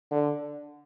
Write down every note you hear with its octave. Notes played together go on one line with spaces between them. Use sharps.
D3